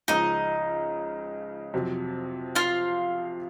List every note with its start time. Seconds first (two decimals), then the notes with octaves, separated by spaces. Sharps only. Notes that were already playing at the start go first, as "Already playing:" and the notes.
0.08 C#2 C#3 F3 D#4 D#5
1.74 F2 C3 F#3
2.55 F4 F5